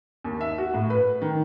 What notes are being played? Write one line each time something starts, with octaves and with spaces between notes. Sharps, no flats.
D#2
E5
F#4
A2
B4
D#3